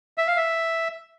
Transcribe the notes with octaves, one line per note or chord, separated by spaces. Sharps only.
E5
F5
E5